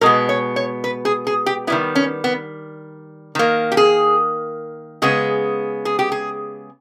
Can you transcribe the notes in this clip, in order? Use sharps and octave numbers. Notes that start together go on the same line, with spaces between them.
B2 G#3 B3 A#4
C#5
C#5
B4
G#4
G#4
G4
D#3 G3 B3 E4
C#4
B3
D#3 A#3
G4
G#4
C#3 G#3 B3 G#4
G#4
G4
G#4